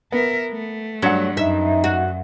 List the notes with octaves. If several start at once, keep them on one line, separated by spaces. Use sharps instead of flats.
B3 A#4 E5
A3
G2 F#3 F#5
F#2 D#4 E5
F#4